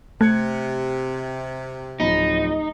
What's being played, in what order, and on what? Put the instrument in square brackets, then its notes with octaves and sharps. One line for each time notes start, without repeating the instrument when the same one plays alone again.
[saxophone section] C3 [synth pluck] A3 [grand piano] F#6 G#6 C#7
[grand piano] D1 F3 B5 [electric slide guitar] D#4